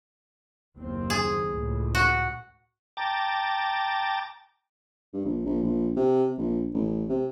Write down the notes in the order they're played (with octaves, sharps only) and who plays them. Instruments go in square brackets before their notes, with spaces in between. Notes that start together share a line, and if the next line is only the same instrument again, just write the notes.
[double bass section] F#1 D#2 C4
[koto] G#4
[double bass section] C#2 A2
[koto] F#4
[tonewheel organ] G5 A5 A#5 D6 A6
[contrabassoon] G2
A#1
A#1
A#1
C3
A#1
A1
C3